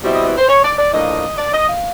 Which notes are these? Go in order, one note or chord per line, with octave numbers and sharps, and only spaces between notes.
B2 G3 C4 E4
D#5
B4
C5
C#5
D5
D5
A2 F3 A#3 D4 D#5
D5
D#5
F5